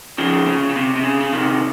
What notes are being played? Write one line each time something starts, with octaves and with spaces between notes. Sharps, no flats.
C#3 F3
C#3
C#3
C3
C3
C#3
C#3
C3 D#3